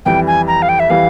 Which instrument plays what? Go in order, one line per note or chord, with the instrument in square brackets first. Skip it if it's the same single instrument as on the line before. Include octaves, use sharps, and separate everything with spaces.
[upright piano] F2 E3 G3 [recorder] G5
[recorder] G#5
A#5
F5
G5
E5
[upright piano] E3 G3 [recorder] F5